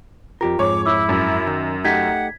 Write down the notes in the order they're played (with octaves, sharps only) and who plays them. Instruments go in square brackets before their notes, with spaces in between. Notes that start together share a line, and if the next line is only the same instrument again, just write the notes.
[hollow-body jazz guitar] F2 G4 A#4 [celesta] F4
[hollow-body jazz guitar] F2 G#2 [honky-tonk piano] C#5 [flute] D6
[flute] E4 [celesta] D6 E6
[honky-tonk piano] F#2
[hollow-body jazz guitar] D#3
[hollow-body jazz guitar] A3 D#4 G4 [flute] F#5 [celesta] G#6 B6